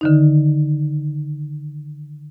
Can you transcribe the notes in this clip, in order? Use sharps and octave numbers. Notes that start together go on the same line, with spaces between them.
D3 D#3 D#4